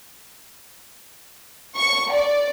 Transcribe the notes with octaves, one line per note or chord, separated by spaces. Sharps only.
C#6
D5